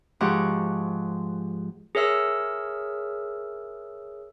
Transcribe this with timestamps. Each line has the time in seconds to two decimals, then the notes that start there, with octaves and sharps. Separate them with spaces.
0.20 G#2 F3 G4 F#5 C#6 D6
1.95 G#4 A#4 C#5 E5 E6